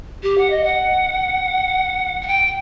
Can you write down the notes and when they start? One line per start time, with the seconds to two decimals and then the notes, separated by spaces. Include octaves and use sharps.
0.23 G4
0.38 F#5
0.50 D#5
0.64 F#5
2.21 F#5
2.27 G5